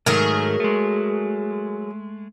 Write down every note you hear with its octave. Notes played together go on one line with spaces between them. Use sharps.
G#2 D#3 F#3 A3 G#4 A#4
G#3 A3